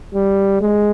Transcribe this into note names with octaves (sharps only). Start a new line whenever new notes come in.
G3
G#3